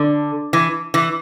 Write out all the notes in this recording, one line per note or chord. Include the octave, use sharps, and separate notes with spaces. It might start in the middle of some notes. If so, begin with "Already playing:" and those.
Already playing: D3
E3
E3